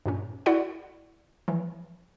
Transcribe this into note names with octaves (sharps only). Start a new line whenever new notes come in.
G2 A#2 C#4
E4 F#4 D5 F#5
E3 F3